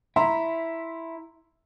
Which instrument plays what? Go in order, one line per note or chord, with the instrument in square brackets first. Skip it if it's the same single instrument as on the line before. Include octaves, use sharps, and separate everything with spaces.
[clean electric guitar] E4 [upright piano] E5 A#5 C6